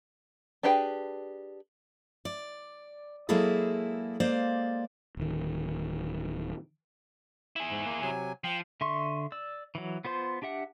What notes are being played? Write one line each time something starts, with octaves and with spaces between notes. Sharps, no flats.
D4 G4 G#4 B4 G5
D5
F#3 G#3 A#3 E4 G#4 A4
G#3 A#3 C5 D5 F5
D1 D#3
E4 G#4
G#2
A#3
C3 F#3 G#5
F3 G5
D3 E5 C6 C#6
D5 E6
E3 F#3
B3 F4 C5 C6
D4 G4 E5 F#5